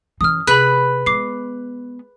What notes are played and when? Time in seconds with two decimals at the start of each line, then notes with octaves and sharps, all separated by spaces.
0.21 F#2 E3 D#6 F6
0.47 C3 G#4 B4 B5
1.06 G#3 B3 D6 C7